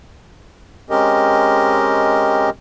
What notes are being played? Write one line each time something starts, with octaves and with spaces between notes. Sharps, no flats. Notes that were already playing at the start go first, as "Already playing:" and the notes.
G#3 C4 C#4 G4 A#4 D#5